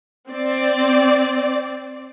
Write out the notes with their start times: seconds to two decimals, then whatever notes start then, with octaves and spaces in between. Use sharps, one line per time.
0.29 C4 D5